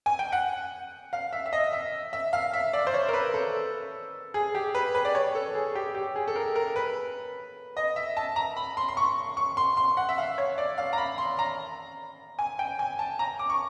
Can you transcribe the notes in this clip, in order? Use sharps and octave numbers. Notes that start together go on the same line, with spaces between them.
G#5
G5
F#5
F5
E5
E5
D#5
E5
E5
F5
E5
D5
C5
C#5
A#4
B4
A4
G#4
G4
B4
B4
D5
C#5
A4
G#4
G4
G4
G#4
A4
A#4
A#4
B4
D#5
E5
A5
A#5
B5
C6
C6
C#6
C#6
C6
C6
F#5
E5
F5
C#5
D5
F5
A#5
B5
C6
A#5
G#5
G5
G#5
A5
A#5
D6
C#6